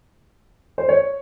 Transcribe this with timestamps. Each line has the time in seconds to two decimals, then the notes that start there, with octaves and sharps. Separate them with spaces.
0.78 C5
0.89 C#5